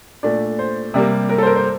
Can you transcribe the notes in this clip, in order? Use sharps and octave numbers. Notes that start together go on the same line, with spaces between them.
A#2 A3 D4 D5
C5
C3 G3 A#3
A#4
A4
C5
A#4
C5